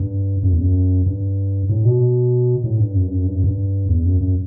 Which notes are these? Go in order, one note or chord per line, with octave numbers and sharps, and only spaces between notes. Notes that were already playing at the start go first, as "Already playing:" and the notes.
Already playing: G2
F#2
E2
F#2
G2
A2
B2
A2
G2
F#2
G2
F#2
G2
F#2
G2
E2
F#2
F#2